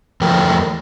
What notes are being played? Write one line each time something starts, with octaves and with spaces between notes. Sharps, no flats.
E2 F3 A3 A#4 G5